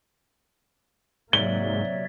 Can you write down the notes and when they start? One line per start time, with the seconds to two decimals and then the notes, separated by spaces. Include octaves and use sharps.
1.33 G#2 C3 F#3 A#3 C#5 D5 E5 G7